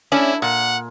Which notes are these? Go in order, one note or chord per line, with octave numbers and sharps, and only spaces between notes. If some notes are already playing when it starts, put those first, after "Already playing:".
A3 C#4 D4 E4
A#2 F#5